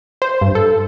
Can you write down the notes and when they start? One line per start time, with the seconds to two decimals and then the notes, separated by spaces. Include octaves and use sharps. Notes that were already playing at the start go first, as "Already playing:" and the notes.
0.22 C5
0.41 G2
0.55 A4